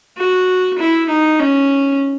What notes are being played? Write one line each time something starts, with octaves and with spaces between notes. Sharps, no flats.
F#4
E4
D#4
C#4